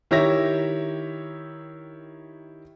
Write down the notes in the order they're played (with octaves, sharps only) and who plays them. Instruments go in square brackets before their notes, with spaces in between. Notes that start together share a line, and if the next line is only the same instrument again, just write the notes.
[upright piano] D#3 E4 G4 C#5 E5 A#6